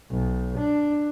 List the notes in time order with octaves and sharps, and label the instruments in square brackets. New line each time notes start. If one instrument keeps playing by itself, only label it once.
[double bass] B1
D4